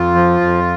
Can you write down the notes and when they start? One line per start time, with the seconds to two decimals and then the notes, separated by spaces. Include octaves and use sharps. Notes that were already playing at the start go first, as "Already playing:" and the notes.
Already playing: F2 F4
0.15 F3
0.41 F2